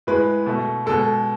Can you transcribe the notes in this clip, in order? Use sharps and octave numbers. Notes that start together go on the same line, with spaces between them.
A2 G#3 B4
B2 A3
B2 G#3 A4